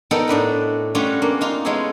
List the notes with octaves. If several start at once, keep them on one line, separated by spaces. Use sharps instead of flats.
B3 D#4 A4 A#4 D5 G5
A2 D4 B4 G5
G3 A3 C#4 D4 F4 F#4
A#3 B3 D4
D#4 F4 F5
G#3 B3 C#4 E4 G#4 A4